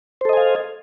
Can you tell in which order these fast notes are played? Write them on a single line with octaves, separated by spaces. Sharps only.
C5 A4 D#5 G#5 F5